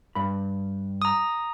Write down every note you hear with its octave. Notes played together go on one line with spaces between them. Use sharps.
G2 B5
A#5 D#6